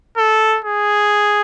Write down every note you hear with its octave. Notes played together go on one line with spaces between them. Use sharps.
A4
G#4